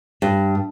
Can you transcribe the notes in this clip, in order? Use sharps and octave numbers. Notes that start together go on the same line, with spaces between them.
G2